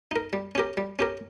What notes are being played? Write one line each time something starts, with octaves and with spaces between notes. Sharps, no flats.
D#4 A#4
G3
C#4 G4 A#4
G3
C#4 G4 A#4